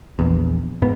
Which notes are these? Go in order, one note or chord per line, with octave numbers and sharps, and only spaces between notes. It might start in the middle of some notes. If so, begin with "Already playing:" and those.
A#1 E2
G#2 B3